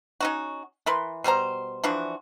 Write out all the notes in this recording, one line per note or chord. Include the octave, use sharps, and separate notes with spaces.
C#4 D#4 F#4
E3 A#4 B4 C6
B2 G3 C5 A#5
E3 F3 D4 F#4